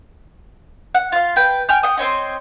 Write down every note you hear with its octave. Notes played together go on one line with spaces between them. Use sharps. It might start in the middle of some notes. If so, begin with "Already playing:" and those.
F#5
F4 F5
B4 G5
G5 G#5 F6 G6
F#5 G5 D#6
C4 C5 C#5 D#5